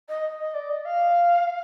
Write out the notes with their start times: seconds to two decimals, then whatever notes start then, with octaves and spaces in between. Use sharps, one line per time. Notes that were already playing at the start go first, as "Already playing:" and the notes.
0.08 D#5
0.40 D#5
0.54 D5
0.69 D#5
0.85 F5